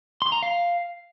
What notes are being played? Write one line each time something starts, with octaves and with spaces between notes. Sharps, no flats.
C6
A#5
F5